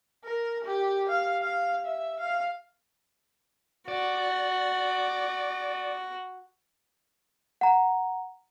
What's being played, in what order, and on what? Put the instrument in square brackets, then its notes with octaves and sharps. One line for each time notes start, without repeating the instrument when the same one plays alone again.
[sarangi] A#4
G4
F5
F5
E5
F5
[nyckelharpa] F#4 [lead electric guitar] D5
[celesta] F#5 A#5